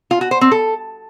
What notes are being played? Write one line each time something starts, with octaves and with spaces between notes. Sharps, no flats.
F4
F#4
C5
C4
A4